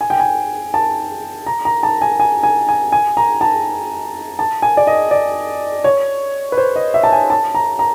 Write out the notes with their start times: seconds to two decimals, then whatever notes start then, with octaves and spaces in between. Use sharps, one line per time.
0.01 G#5
0.10 G5
0.20 G#5
0.74 A5
1.46 A#5
1.65 A#5
1.83 A5
2.02 G#5
2.20 G#5
2.43 G#5
2.68 G#5
2.92 G#5
3.17 A#5
3.41 A5
4.39 A5
4.62 G#5
4.77 D5
4.87 D#5
5.11 D5
5.84 C#5
6.52 B4
6.58 C5
6.76 D#5
6.94 E5
7.03 A5
7.12 G#5
7.30 A5
7.55 A#5
7.79 A#5